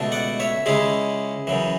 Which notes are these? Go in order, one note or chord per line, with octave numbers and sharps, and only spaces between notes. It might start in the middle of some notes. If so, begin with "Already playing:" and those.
Already playing: C#2 B2 A3 D4
D5 F#5
C#5 E5
C#2 C#3 G#3 C#4 E4 G#4
F#2 C#3 E3